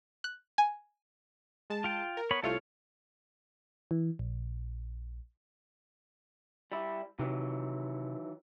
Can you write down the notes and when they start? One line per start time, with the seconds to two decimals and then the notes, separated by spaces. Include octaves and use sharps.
0.24 F#6
0.58 G#5
1.70 G#3 A5
1.84 F4 G5
2.17 A#4
2.31 B3 C#5 B5
2.43 C2 A3 F4 A4 C#5 F5
3.91 E3
4.19 A#1
6.72 G3 E4
7.19 C3 D#3 E3 F#3